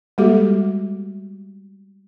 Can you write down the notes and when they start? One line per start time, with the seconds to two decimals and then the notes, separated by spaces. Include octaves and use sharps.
0.18 G3 G#3 A#3 F#4 G4 A4